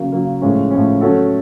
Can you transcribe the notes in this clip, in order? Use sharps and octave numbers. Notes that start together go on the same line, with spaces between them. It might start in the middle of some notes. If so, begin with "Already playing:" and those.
Already playing: C#3 F#3 A#3
C#3 F#3 A#3
A2 F3 G#3 C#4
A2 F3 G#3 C#4
F#3 A3 C#4 F#4 A4